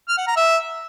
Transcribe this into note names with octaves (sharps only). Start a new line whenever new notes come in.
F6
F#5
A#5
E5